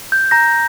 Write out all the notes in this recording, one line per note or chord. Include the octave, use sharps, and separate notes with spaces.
G6
A#5 G6 A#6